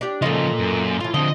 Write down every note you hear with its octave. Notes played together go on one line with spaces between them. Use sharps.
D4 G4
C#3 F3 A#3 F4 A4 D#5
F#2
A2 E3 F4
D3 F3 C4 D#5